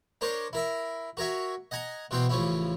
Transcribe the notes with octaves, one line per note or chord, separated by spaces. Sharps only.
D4 A#4 C5 C#5
E4 A#4 E5
F#4 A#4 C#5 E5
D#5 F#5 G#5 A#5
B2 E3 B3 C4 C5
A1 C#3 F3 C#4 E4